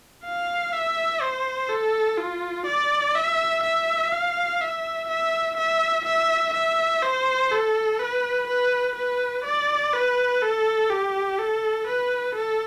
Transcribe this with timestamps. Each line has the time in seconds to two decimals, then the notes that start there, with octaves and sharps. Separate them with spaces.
0.25 F5
0.73 E5
1.22 C5
1.69 A4
2.18 F4
2.66 D5
3.15 E5
3.63 E5
4.12 F5
4.60 E5
5.08 E5
5.58 E5
6.06 E5
6.54 E5
7.02 C5
7.51 A4
8.00 B4
8.48 B4
8.95 B4
9.45 D5
9.93 B4
10.42 A4
10.90 G4
11.39 A4
11.87 B4
12.36 A4